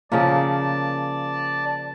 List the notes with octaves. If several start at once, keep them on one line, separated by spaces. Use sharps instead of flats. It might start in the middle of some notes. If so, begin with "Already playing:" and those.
C#3 F3 A#3 D5 A5